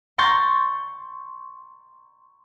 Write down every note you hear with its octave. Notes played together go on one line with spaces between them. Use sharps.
A#5 C6 C#6 G6 A6